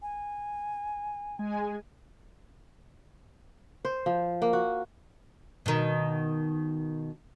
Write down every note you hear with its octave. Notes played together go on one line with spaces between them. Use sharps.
G#5
G#3 G#5
C5
F3
A#3
F#4
B2 D#3